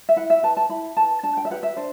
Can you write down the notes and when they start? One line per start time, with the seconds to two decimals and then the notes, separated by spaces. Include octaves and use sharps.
0.09 E5
0.16 E4 F#5
0.30 E5
0.43 B4 A5
0.57 A5
0.69 E4 B5
0.97 B4 A5
1.23 D4 A5
1.37 G5
1.45 E5
1.50 G4 B4 F#5
1.63 E5
1.77 D4 C5